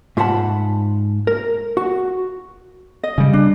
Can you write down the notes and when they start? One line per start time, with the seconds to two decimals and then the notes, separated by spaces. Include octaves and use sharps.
0.17 G#2 F4 E5 F#5 A5 B5
1.27 A#4
1.77 F#4
3.03 D#5
3.18 C#3 G3
3.33 D4